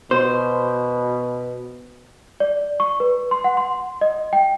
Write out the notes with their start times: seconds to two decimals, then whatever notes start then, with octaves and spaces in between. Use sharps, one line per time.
0.11 B2 C5
2.40 D5
2.80 C#6
3.00 B4
3.31 C6
3.44 F#5
3.57 C6
4.01 D#5
4.33 G5